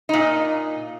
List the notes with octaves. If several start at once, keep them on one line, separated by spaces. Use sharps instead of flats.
A#2 D#4